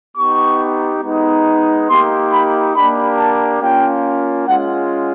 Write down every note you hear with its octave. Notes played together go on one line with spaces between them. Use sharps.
B3 D#4 G4 C#6
G#3 B3 D#4
A#3 D#4 G4 C6
B5
A#3 D4 G4 B5
A5
A#3 C#4 F4 G5
G#3 C#4 F4 F#5